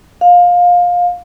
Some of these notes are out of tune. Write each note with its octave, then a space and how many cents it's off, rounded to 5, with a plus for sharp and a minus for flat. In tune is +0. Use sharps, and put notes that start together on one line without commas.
F5 +20